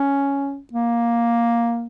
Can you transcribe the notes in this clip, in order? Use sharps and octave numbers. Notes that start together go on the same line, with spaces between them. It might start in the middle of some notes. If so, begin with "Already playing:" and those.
Already playing: C#4
A#3